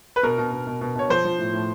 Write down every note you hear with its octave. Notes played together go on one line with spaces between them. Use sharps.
B4
B2 A#4
B2
B2
B2
B2
B2 C#5
F3 C5
F3
A2
A2